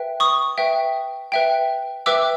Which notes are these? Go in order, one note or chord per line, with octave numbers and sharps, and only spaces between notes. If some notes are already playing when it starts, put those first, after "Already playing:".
Already playing: B4 E5 G5
C#6 D#6
B4 E5 G5
B4 E5 G5
B4 E5 G5 D6 E6